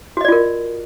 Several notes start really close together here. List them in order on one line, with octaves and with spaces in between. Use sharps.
F#4 D#5 D5 F4 A#4